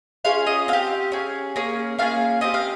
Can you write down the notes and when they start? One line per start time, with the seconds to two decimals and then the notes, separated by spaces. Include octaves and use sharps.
0.25 C#4 F4 G#4 F5
0.47 D#5
0.68 C4 G4 F5
1.12 C#4 G#4
1.56 A#3 C#4 G#4
1.98 A#3 C#4 F4 G#4 F5
2.41 C4 G4 D#5
2.54 F5